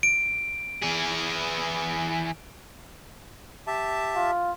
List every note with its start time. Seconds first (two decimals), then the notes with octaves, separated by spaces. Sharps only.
0.03 D7
0.83 E3 G#4
3.67 G4 E5 A5
4.16 F4